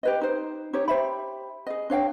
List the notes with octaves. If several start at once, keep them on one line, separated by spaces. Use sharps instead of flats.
G4 B4 D#5
D#4 C5
D#4 G4 C#5
G4 C5 E5 B5
G#4 D#5
D4 C#5 F5 G5